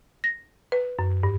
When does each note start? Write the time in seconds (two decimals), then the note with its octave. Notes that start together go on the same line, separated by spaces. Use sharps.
0.24 A#6
0.72 B4
0.99 F#2
1.23 G2